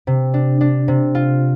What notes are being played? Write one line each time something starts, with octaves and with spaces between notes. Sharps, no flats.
C3
D4
D4
C3
F4